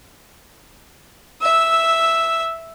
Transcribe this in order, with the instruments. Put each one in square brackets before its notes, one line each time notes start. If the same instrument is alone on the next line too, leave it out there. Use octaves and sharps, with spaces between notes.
[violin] E5 E6